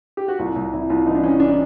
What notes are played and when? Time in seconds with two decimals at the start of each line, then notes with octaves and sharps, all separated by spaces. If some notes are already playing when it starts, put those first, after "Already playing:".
0.17 G4
0.28 F#4
0.39 C2 F4
0.56 C2
0.73 C2 E4
0.90 C2 F4
1.06 E3 D#4
1.15 D4
1.23 E3 C#4
1.40 D4